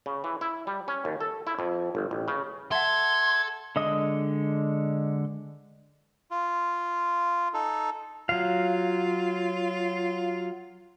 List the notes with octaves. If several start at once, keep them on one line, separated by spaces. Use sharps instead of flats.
C#3
E3
E4
G3
C#4
D#2
A4
E4
F2
G1
A1
C#3
A4 E5 F#5 A5 C6 G#6
D3 G#3 D#5 D#6
F4
D#4 A4
F#3 F4 F5